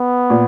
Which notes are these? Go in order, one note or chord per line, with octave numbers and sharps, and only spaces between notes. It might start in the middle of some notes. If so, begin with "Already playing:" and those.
Already playing: B3
A#2